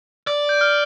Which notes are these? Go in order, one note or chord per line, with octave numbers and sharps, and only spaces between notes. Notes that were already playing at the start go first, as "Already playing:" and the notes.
D5
G6
F6